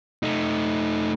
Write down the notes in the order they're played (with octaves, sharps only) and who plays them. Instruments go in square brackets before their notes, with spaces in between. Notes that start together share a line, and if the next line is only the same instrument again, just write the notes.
[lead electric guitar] A3 D#4